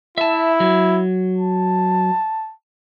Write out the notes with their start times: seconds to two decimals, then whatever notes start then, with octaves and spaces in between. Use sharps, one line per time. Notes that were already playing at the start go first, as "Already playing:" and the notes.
0.18 E4 E5 A5
0.60 F#3
1.38 A5